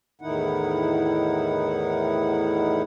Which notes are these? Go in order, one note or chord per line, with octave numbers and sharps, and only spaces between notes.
E2 A2 D#3 D#4 E4 F#5